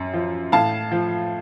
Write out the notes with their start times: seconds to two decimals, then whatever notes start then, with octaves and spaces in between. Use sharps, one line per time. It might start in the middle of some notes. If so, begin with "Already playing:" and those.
Already playing: F#2
0.14 F3
0.52 A2 F5 A5
0.92 F3